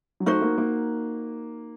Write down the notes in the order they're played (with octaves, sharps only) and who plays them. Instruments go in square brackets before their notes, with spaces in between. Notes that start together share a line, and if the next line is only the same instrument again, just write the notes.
[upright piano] F#3
[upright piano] A3 [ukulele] D#4 F#4 C5
[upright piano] A#3
A#3